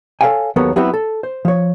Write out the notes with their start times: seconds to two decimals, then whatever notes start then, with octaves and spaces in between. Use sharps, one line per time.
0.21 A4 B4 C#5 F5 G5 G#5
0.56 D#2 F#3 B3 A4 A#4 C#5
0.76 F#3 B3 C4 E4 F#4 G4
0.93 A4
1.23 C5
1.45 F3 C#5